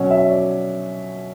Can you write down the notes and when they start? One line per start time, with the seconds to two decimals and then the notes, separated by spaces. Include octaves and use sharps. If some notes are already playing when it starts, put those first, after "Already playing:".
Already playing: B2 F#3 C#4
0.11 E5
0.31 D5